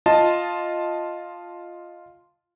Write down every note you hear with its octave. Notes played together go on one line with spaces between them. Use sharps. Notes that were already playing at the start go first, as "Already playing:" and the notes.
F4 D#5 A5